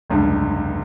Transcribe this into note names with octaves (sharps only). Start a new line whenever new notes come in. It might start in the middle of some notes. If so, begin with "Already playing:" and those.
F1 C#2 G2